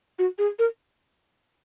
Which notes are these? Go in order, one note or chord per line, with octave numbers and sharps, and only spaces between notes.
F#4
G#4
A#4